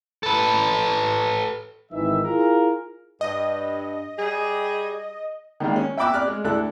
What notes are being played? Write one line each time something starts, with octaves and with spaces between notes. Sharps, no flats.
A4 B4
G#1 D#3 E3 E5
E4 F4 G#4 A#4
G2 D#5
G3 G#4
D#3 G3 G#3 A#3
C#4
E5 G5 B5 D6 E6 F#6
D5 F6 F#6
G#3
D2 D4 E4 A4 F#6